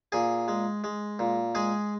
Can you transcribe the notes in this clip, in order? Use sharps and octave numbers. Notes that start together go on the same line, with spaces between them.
A#2 G#4 G#5
G#3
G#3
A#2
G#3 G#4 G#5